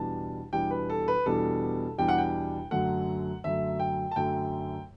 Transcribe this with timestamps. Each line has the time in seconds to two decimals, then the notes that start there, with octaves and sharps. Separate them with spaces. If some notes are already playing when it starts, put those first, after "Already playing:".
Already playing: E2 B2 G3 D4 A5
0.52 E2 B2 G3 D4 G5
0.71 B4
0.90 A4
1.08 B4
1.26 E2 B2 G3 D4 A4
1.98 E2 B2 G3 D4 G5
2.08 F#5
2.18 G5
2.71 F#2 D3 F#3 A3 F#5
3.44 F#2 D3 F#3 A3 E5
3.80 G5
4.11 A5
4.16 F#2 D3 F#3 A3 G5